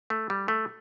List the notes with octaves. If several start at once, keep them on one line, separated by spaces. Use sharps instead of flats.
A3
G3
A3